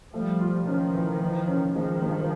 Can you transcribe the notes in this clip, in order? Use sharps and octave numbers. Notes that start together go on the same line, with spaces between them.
F3 G3 A3
F4
D#3 F3 C#4
E3
E3
C#4
D#3 F3 G#3
G2